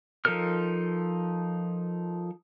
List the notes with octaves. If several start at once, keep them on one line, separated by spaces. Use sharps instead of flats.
F3 D#4 A4 A#4 F6